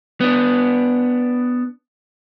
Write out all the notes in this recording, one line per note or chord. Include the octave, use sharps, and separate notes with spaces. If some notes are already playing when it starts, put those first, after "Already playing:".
B3 D4